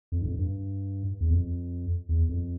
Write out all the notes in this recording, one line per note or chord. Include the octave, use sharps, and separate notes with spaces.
F2
G2
F2
G2
E2
F2
E2
F2